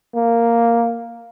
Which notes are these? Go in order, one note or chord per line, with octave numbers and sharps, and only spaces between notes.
A#3